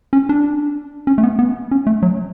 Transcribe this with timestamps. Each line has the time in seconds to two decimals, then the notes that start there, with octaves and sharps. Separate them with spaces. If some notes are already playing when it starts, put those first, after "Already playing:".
0.13 C#4
0.29 D4
1.07 C#4
1.18 A3
1.23 B3
1.39 B3
1.71 C#4
1.87 A3
2.02 F#3